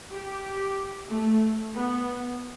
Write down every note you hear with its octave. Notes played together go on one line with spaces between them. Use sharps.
G4
A3
B3